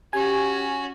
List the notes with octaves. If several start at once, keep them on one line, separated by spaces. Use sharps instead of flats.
C#4 F#4 G4 G#5